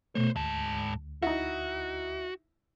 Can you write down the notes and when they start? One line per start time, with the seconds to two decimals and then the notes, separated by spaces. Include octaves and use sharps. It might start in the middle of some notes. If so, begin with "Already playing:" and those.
0.15 B2 A3 C5 C#5
0.36 D2 G#2 A5
1.22 D#4 E4 F#4